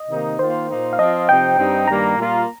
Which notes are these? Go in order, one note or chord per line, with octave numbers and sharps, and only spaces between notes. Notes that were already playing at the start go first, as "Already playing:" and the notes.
Already playing: D#5
C3 D#3 A#3 D#4
D#3 A#3 F4 C5
A#2 A#3 D#4
F5
F3 C4 F4 D#5
C3 F3 C4 D#4 G5
G2 G3 C4 D#4
G2 D#3 G3 A#3 A#5
A#2 G3 A#3 F4